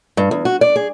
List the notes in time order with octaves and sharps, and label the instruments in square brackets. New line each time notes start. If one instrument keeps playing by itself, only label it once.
[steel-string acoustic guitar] G2
E2
F#4
D5
G#4